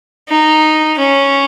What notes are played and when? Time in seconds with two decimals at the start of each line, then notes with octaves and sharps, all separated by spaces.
0.29 D#4
0.98 C#4